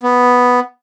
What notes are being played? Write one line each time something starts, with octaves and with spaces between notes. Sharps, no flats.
B3